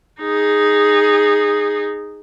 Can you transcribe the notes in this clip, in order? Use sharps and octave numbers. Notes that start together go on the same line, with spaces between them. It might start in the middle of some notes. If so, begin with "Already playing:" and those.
D#4 G#4